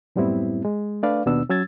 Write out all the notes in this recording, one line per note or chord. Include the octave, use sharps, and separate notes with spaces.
F#2 A2 G3 B3 C4 E4
G#3
A3 D4 B4 D5 F5
D#2 B2 B3 D4 E6
F#3 C#4 E6 G#6 A6